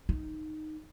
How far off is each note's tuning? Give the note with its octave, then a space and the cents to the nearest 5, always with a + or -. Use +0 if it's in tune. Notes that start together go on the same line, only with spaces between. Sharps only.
D#4 -5